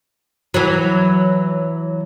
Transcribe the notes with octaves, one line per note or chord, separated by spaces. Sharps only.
E3 F#3